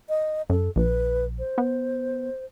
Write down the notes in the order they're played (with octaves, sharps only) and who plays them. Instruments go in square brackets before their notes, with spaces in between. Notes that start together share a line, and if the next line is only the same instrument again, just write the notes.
[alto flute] D#5
[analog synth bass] F#2 [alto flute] A4
[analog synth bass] A#1 [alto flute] B4
[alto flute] C5
[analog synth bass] B3